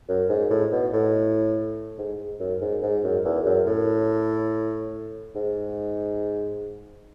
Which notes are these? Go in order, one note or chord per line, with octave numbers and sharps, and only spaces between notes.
F#2
G#2
A2
B2
A2
G#2
F#2
G#2
G#2
F#2
E2
F#2
A2
G#2